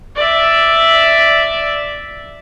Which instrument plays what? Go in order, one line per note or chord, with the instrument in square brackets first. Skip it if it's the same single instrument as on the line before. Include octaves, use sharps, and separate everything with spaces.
[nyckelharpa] D5 E5